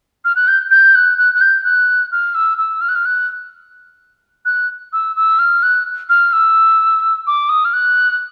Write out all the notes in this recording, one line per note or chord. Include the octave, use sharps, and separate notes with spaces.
F6
F#6
G6
G6
F#6
F#6
F#6
G6
F#6
F6
E6
E6
F6
F#6
F6
F#6
F#6
E6
E6
F6
F#6
F6
E6
D6
D#6
F6
F#6